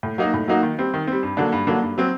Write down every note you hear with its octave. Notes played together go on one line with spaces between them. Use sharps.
A2
F#3 A#3 D#4 F#4
A2
F#3 A#3 D#4 F#4
D#3
G3 C4
D#3
G3 C4
G2
D3 F#3 A#3 D4
G2
D3 F#3 A#3 D4
G2
F#3 C4